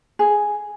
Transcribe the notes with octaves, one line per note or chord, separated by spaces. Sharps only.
G#4